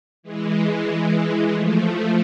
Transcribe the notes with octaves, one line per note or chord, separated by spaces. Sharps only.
E3 G#3
F3 A3